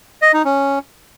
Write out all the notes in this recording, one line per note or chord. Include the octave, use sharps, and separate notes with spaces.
D#5
D#4
C#4